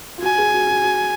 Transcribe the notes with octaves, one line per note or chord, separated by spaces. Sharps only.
F4
F#4 G#5
G#4
F#4
F#4
F#4